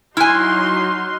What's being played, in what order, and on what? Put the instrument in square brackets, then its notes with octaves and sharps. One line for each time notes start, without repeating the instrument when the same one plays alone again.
[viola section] F#3 D#4 C6 [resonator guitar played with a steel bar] E4 G#5 [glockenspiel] F6 F#6